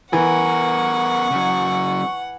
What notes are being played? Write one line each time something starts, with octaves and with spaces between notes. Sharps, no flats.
E3 B3 A#4 F#5 C#6
C#3 F#3